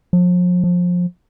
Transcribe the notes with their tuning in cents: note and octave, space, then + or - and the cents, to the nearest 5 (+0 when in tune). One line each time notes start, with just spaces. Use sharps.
F3 +40
F3 +25